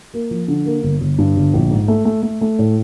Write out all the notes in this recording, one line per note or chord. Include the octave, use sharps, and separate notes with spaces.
A#3
F3
D3
A#3
G1
G1
G2
G1
A#1
G#2
A3
A3
A3
A3
A2